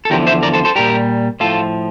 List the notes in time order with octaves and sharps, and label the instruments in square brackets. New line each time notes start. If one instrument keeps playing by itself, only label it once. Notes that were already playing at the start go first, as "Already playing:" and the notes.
[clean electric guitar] A4
E2 D3 F3 G4 A#4
C5 E5
A#4 D5
A4 C5
A4 C5
A#2 G3 G4 A#4
A2 F3 F4 A4